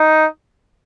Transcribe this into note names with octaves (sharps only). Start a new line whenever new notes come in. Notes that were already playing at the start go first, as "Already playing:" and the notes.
Already playing: D#4